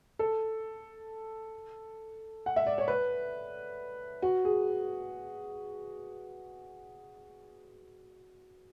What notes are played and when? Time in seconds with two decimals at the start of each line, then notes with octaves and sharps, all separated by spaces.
0.19 A4
2.46 F#5
2.56 E5
2.66 D5
2.78 C#5
2.88 B4
4.22 F#4
4.45 G#4